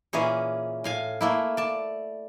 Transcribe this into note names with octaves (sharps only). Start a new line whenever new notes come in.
A#2 E3 A#3 C#4 G#4 C#5
A2 F5 G#5
A3 A#3 E4
D5 A5